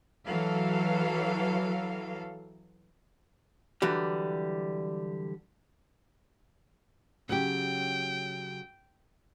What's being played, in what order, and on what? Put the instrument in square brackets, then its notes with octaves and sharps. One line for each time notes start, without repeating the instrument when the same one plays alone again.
[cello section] E3 F#3 A4 F5
[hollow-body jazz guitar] D3 E3 F#3 G3
[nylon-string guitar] C#3 F#3 G4 [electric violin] G5